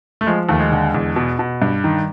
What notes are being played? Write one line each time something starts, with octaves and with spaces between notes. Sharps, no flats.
A3
F3 G#3
D#2 A3
G#3
D3
E2
B2
B2
G2
D#3